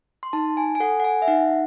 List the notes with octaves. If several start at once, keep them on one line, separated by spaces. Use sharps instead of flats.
C6
D#4 A5
G#5
G#5
A4 F#5
F#5
G#5
E5
D#4 F#5